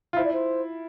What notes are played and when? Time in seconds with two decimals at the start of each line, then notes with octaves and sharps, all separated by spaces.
0.13 F4
0.17 E4 C5
0.24 D5
0.33 C5